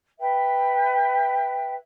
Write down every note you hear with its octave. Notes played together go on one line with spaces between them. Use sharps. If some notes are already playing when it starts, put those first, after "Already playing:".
B4 E5 G5